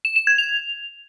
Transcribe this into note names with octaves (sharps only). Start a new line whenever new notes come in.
E7
E7
G#6
F7